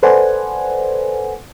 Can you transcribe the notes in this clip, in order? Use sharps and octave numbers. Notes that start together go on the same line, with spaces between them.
A4 B4 C5 D5 F#5 G#5